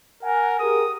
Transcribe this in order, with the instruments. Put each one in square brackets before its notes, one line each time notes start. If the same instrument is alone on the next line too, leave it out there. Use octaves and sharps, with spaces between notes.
[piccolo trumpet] A#4 [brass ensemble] F#5 G#5
[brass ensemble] G4 G#4 A#4 [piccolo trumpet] D#6